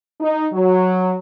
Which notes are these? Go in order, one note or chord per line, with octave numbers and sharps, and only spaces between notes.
D#4
F#3